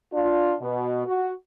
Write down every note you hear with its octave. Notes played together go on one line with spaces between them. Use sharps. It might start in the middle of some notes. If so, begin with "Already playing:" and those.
D4 F4
B2
F#4